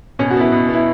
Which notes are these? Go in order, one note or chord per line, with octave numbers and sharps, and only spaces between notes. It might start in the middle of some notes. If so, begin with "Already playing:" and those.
B2 C#4
F#4
B3 E4 B4
B2
B3 E4